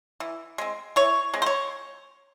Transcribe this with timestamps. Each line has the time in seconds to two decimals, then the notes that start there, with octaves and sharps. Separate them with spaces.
0.20 E3
0.58 G#3 C4
0.96 E3 C#5
1.34 G#3 C4
1.42 C5
1.46 C#5